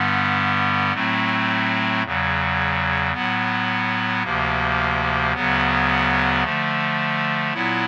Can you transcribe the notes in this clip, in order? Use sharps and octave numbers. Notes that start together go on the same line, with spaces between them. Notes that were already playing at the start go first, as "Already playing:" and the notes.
Already playing: G2 D3 G3 B3
A2 F#3 A3 C4
E2 C#3 F#3
A2 F#3 B3
D2 C3 F3 A#3
D2 C#3 F#3 B3
D3 F3 A3
A#2 F#3 B3 E4